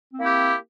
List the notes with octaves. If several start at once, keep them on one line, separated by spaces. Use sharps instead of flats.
A#3 C4 E4 G4